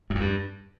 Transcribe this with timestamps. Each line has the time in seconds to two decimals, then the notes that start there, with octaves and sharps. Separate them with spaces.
0.10 F#2
0.15 F2
0.20 G2